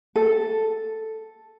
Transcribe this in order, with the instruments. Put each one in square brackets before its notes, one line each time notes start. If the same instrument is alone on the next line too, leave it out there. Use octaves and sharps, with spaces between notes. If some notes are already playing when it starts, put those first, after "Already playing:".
[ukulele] A4